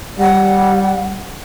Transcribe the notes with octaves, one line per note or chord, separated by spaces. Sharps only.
G3 F#5